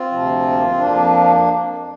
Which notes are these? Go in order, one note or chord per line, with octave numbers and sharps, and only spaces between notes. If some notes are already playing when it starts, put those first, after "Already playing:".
Already playing: C4 F4
D2 C3 F3
A#3
C4
F2 F3 A#3 D4